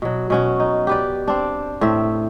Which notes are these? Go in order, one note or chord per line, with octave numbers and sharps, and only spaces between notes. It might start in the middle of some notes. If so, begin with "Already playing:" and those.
B2 F#3
B2 C#4 F#4
D#4
G4 B4 D5
C4 D4
A2 C4 E5